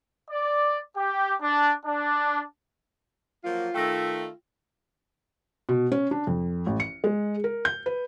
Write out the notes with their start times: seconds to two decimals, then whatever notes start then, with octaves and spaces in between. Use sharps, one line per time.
0.31 D5
0.97 G4
1.42 D4
1.86 D4
3.44 F3 F#3 A#3 F4
3.74 D#3 A3 G5 E6 A#6
5.69 B2
5.92 C#4
6.11 D4
6.27 F2
6.66 A1
6.80 C#7
7.04 G#3
7.44 A#4
7.65 G6
7.86 B4